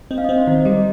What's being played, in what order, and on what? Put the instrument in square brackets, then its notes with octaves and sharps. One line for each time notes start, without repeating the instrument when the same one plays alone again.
[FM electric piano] C4 [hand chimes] D#5
[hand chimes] F5
[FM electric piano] C4 [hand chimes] D#5
[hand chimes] C5
[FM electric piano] D#3
[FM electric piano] G3 [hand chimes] D#5